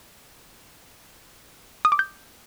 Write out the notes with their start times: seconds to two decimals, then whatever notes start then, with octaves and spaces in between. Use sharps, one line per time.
1.85 D#6
1.92 D6
1.99 G6